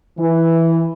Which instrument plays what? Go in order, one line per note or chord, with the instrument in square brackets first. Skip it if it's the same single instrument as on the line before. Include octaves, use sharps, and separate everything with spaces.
[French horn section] E3